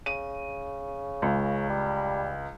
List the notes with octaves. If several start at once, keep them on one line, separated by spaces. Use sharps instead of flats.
C#3 D#7
C#2
G3